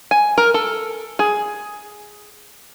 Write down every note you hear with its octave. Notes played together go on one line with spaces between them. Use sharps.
G#5
A#4
A4
G#4